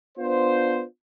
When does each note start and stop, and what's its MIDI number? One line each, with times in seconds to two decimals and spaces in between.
0.17 0.84 59
0.17 0.84 62
0.17 0.84 65
0.17 0.84 72